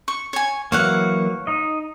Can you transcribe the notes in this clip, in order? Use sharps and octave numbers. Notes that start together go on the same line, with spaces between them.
C#6
C#5 G#5
E3 F#3 A#3 C#5 F5 F#5
D#4 D#5